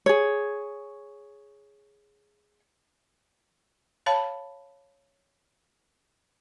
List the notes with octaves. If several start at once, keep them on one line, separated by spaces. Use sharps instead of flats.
G#4 C#5
C#5 F5 A5 B5